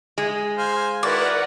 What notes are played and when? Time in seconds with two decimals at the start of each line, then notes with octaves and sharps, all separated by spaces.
0.18 G#3
0.57 C5 F5 G#5
1.03 D#3 E4 F#4 A#4 B4 D5 F#5